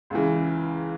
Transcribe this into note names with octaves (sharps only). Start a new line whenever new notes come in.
C#2 C#3 E3